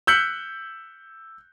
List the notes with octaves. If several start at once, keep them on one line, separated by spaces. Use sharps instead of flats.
E6 F#6 G6 B6 C#7 F#7